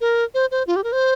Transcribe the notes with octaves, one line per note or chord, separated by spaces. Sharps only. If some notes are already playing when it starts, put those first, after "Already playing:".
A#4
C5
C5
F4
G4
A#4
C5